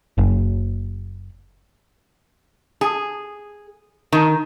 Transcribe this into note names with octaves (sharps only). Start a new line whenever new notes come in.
F#1
G#4
D#3